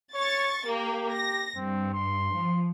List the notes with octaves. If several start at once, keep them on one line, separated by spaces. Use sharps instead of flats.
C#5 C#6 A6
A#3 G4
A#6
G2 C4
C6
F3